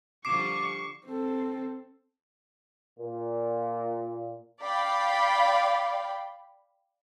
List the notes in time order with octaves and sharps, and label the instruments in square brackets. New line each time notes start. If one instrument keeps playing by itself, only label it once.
[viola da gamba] D3 F3 G3 [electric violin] C#6 [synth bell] D6 [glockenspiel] C7 E7
[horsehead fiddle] C4 A4
[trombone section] A#2
[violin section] D5 F5 G5 B5